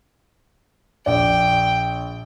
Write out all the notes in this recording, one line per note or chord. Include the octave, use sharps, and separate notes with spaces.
A#1 D5 G5